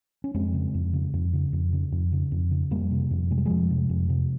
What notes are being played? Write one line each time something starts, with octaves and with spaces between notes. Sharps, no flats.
C#4
F2 G#3 C4
C#3
F2
C#3
F2
C#3
F2
C#3
F2
C#3
F2
C#3
F2 G3 A#3
C3
F2
C3 G#3
G3
F2 F3 G#3
C3
F2
C3